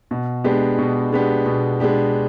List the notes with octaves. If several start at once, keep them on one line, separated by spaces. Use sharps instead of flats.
B2
G#3 B3 D4 G4
B2
G#3 B3 D4 G4
B2
G#3 B3 D4 G4